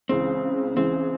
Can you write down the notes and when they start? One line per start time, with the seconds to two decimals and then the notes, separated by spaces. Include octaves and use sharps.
0.09 C#2 C#3 E3 G#3 C4
0.76 C#2 C#3 E3 G#3 C4